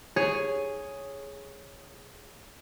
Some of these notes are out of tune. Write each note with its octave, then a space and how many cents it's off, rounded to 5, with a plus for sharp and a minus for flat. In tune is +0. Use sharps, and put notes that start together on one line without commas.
G#4 +0 C#5 +0